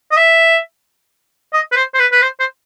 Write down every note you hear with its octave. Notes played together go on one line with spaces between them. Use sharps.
D#5
E5
D#5
B4
C5
C5
B4
B4
C5
C5